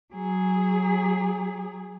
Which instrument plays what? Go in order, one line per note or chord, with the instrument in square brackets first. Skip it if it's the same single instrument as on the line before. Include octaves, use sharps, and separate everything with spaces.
[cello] F#3 G#4